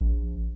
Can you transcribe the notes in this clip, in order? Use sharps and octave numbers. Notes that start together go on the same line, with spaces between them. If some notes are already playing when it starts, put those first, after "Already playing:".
A#1